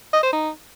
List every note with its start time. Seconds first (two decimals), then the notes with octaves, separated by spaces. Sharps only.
0.13 D#5
0.23 C5
0.33 D#4